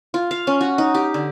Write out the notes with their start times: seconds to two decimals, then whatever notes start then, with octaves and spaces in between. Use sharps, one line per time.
0.14 F4
0.31 F5
0.47 C#4
0.61 F#4
0.78 D#4
0.94 G4
1.14 D3